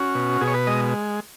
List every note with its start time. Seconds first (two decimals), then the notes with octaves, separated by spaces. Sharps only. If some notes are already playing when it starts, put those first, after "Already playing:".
Already playing: C#4 F#4
0.15 B2
0.41 B2 G#4
0.48 C#5
0.54 B4
0.67 G#3 D#5